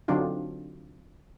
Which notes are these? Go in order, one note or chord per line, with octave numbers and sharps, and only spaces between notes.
D3 F#3 C4 D4 D#4 F4